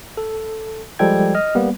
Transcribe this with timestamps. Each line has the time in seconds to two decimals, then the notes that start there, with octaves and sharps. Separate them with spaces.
0.17 A4
0.99 F3 G3 G#3 A4 G5 G#6
1.35 D#5 F6
1.55 G3 A#3 B3